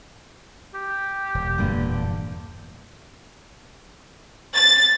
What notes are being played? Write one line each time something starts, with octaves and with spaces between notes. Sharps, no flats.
G4
E1
G2 A#2 D3
A6